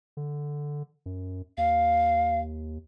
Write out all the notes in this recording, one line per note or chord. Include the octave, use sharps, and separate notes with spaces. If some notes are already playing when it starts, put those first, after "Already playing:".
D3
F#2
D#2 F5